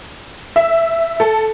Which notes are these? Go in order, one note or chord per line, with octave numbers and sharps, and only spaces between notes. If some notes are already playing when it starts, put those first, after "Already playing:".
E5
A4